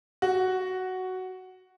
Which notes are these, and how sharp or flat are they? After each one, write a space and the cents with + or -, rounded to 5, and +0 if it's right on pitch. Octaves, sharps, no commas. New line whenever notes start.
F#4 +5